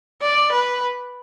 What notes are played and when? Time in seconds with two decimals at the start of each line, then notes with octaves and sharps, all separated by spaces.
0.22 D5
0.52 B4